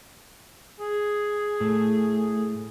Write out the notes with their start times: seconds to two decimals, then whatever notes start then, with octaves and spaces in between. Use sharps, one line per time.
0.80 G#4
1.60 A2 A3